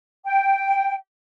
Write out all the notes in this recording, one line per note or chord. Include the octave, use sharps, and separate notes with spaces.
G5